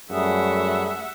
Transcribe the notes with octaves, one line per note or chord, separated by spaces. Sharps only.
F#2 G3 A3 G#4 E5 F#5